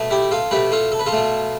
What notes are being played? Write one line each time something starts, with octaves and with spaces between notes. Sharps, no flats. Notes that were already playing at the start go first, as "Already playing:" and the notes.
Already playing: B2 A3
E4 G4
F4 A4
B2 A3 G4 B4
F4 A4
A4
B4
F4 A4
B2 A3